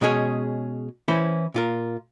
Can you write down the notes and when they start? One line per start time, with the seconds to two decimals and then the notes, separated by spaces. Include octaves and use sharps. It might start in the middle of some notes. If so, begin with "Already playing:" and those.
0.01 B2 G#3 C#4 G#4 C#5
1.08 E3 C#4 E4 C5
1.54 A#2 F4 A#4